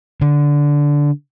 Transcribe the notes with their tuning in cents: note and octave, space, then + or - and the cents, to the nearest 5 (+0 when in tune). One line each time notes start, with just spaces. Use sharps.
D3 -10